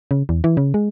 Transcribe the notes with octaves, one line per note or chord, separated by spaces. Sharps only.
C#3
E2
E3
C#3
G#3